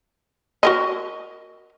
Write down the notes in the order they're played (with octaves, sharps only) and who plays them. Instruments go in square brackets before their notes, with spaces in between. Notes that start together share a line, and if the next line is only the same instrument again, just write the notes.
[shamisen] F#4 A#4 D#5